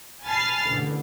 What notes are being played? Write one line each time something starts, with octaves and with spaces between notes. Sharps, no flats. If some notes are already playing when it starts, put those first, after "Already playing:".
G#5 A5 B5 F6 A6 C7
A1 D3